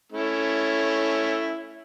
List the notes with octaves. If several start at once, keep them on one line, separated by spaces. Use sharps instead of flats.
A3 C#4 E4